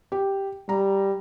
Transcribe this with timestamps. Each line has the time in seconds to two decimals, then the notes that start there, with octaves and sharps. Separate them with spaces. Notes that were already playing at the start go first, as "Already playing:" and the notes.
0.12 G4
0.69 G3 A#5